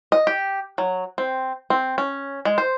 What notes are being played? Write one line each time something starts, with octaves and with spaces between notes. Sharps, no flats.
D#5
G4
F#3
C4
C4
C#4
G#3
C5